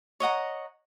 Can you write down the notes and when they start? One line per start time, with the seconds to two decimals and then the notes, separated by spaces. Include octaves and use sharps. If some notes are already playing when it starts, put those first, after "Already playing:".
0.20 C#5 D#5 F#5 A#5